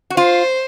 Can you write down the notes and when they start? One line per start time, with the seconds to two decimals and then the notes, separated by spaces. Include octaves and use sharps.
0.10 F#4
0.17 F4 C5